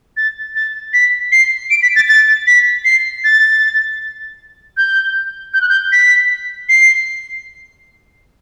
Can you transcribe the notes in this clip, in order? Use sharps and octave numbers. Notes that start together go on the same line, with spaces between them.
A6
A6
B6
C7
D7
B6
A6
A6
B6
C7
A6
G6
G6
F#6
G6
B6
C7